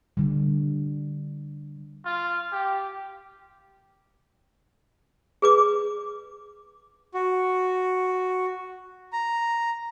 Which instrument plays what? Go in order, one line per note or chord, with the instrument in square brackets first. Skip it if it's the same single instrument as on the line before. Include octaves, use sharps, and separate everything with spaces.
[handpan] D3 G3
[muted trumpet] F4
G4
[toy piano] G#4 B4 D6
[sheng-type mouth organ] F#4
A#5